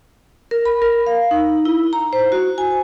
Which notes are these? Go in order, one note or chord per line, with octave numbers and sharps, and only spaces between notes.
A#4
B5
A#4
F5
D#4
E4
A#5
C5
F#4
G#5